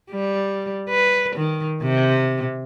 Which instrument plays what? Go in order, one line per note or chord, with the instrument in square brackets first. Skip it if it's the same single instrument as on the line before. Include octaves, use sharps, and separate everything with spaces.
[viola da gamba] G3
B4
D#3
C3